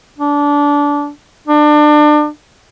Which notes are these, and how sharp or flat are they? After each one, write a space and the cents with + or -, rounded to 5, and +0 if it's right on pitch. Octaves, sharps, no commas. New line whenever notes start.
D4 -20
D4 +30